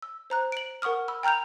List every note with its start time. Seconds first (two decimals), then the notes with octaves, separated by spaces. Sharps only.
0.02 E6
0.30 C5 A#5 F#6
0.52 D7 F#7
0.82 A#4 F#5 C#6 D#6 F6
1.08 B5 E6
1.23 G5 A#5 F6 G6 F7